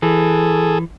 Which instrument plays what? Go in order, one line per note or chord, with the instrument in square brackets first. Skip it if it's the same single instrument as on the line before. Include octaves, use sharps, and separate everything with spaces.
[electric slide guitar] E3 [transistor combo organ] G#4 A4